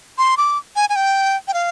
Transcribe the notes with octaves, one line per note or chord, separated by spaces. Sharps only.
C6
D6
G#5
G#5
G5
G5
F5